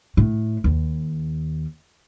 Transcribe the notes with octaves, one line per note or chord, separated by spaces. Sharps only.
A2
D#2